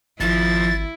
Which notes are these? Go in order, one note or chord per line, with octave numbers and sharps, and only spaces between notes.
G#1 F2 F3 E4 A6